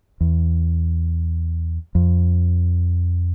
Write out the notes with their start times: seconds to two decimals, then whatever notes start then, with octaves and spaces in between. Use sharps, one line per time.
0.21 E2
1.95 F2